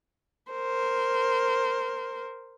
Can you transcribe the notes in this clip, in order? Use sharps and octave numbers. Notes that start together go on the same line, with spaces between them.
A#4 C5